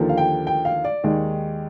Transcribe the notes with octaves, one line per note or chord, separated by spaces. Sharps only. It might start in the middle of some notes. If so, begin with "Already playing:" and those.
Already playing: D#2 D3 F3 A#3
F5
G5
G5
F5
D5
D#2 D#3 G#3